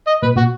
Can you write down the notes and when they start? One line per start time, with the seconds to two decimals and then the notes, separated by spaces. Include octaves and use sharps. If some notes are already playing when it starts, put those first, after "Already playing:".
0.07 D#5
0.22 A#2 B4
0.36 A#2 F#4